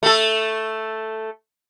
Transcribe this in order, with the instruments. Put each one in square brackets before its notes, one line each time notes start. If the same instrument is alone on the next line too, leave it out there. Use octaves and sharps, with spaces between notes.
[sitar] A3 A4